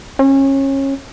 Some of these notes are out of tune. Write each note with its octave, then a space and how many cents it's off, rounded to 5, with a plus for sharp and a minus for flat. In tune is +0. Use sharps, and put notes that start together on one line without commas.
C#4 -25